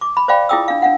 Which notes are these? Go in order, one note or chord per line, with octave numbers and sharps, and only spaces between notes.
D6
B5
C5 D5 F5 G5 B5
E4 F4 G#4 G5 D#6 E6
D4 F5
D4 F5 F#5